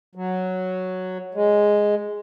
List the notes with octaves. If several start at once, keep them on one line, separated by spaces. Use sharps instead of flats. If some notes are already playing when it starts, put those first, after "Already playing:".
F#3
G#3